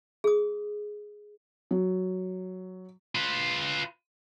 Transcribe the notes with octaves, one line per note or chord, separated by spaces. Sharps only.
G#4 D#6
F#3
F4 B4